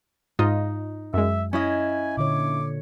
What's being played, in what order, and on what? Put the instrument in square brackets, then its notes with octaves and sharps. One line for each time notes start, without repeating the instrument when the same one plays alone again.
[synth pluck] G#2 F4 D#5 [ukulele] D#4
[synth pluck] F#2 G#3 [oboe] E5
[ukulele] C#4 E4 D#5 [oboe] G#5
[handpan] A#2 D3 C#5 [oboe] D6